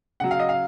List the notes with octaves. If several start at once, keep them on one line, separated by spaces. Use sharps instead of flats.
C#3 F#3 F#5
F5
D#5
F5